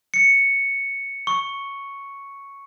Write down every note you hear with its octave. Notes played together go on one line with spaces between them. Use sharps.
C#7
C#6